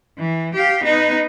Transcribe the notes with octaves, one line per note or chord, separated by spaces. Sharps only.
E3
G4 F5
B3 D#4